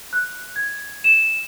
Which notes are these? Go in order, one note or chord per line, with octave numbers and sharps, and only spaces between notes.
F#6
G#6
E7